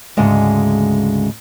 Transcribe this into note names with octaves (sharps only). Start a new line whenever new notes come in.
D2 G#2 C#3 G#3